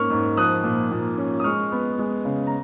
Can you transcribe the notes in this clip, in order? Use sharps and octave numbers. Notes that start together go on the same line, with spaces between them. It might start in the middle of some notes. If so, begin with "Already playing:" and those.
Already playing: G#2 A#3 C#4 C#6 F6
G#2
F3 D#6 F#6
A#2
A#2
C#4
D#6
G#3 C#6 F6
B3
G#3
C#3
A#5